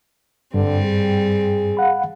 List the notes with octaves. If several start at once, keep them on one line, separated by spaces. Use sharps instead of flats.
G2 D3 G3 C4
G#4
F5 F#5 B5